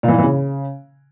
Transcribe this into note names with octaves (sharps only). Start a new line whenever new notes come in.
A#2
E3
A#2
E3
C#3